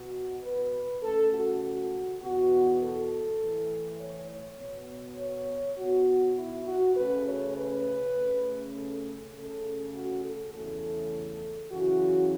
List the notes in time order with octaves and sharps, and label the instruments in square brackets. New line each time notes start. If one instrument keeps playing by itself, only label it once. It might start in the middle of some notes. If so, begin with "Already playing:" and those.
Already playing: [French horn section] B2 B3 F#4
B4
C#3 A3 C#4 A4
F#4
F#4
E2 B2 B3 F#4
A4
A2 E3 A3
C#5
C#5
B2 B3
C#5
B2 B3 F#4
E4
F#4
C#3 A3 C#4 B4
C#5
B4
C#3 A3 C#4
A4
C#3 A3 C#4 A4
F#4
A4
E2 C#3 E3 A3 C#4 A4
F#2 C#3 E3 C#4 F#4